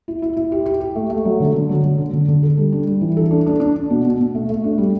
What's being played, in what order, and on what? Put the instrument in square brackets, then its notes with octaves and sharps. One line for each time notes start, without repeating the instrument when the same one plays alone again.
[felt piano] E4
E4
E4
G4
G4
G4
A3
A3
F#3
D3
D3
F#3
F#3
D3
D3
D3
A4
G3
D4
G3
E3
A4
D4
D4
D4
D4
B2
B2
B2
A3
A3
D4
G3